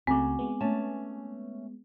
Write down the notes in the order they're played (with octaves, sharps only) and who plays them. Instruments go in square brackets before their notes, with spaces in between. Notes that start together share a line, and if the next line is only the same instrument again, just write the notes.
[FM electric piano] C#2 C#3 A3 [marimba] C4 [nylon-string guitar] F#4 [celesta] G#5 D6
[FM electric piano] G#3 B3
[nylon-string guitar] A3 C#4 A5